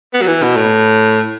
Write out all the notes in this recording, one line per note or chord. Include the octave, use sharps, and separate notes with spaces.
B3
F#3
E3
B2
A2